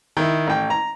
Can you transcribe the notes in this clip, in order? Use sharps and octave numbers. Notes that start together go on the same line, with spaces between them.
D#3 E4
A1 G5
A#5